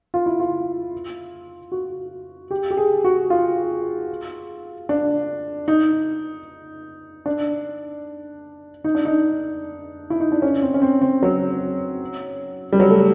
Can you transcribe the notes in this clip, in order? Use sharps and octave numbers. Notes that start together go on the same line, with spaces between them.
F4
E4
F4
F#4
G4
G4
G#4
F#4
F4
D4
D#4
D4
D#4
D4
D#4
E4
D#4
D4
C#4
C4
C#4
C4
C4
F#3
G3
F#3
A3